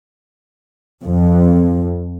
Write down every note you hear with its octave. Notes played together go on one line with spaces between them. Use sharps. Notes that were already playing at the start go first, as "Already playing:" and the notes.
F2